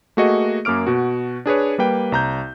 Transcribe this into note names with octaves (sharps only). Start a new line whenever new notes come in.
A3 A#3 F#4 G#4 D#5 C#7
F#2 A#3 D6 F6 D7
B2 F#4
D4 G#4 B4 C#5
G3 A#3 B4 G5
C2 A#5 G6